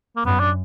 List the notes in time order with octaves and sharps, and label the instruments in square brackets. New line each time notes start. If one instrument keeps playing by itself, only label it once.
[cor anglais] A#3
[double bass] F#2 [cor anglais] B3
[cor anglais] D4